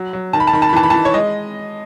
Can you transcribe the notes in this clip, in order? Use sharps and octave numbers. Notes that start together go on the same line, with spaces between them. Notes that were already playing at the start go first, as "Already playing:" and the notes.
Already playing: F#3
F#3
D#3 A5
B5
A5
D#3 B5
A5
B5
E3 A5
B5
A5
E3
C#5
G#3 D#5